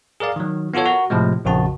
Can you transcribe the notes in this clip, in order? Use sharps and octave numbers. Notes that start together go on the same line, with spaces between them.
G#4 A#4 D5 F5
D#3 F#3
B3 F4 F#4 A4 C#5
F#4 A#4
A2 C3 F3 G#3
A#1 F2 C#3 F#4 A5